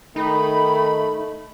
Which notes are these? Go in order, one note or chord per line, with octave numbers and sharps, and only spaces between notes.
D#3 A3 D#4 B5